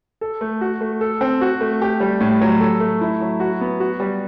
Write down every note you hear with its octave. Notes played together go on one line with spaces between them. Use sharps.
A4
A3
F#4
A3
A4
C4
F#4
A3
G4
G3
A2
F#3
A4
A3
E4
F#3
F#4
B3
F#4
G3